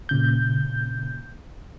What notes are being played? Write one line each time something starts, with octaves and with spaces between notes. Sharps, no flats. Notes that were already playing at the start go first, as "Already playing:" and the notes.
A#2 C#3 G6